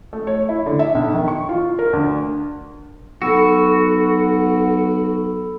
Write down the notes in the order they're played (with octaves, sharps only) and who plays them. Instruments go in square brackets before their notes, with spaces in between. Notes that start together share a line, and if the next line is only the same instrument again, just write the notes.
[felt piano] A3
C#5
E4
D3
E5
B1
D#3
C#6
F4
A#4
D2
[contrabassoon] B1 [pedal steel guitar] F#4 [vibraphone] A4 B5 E6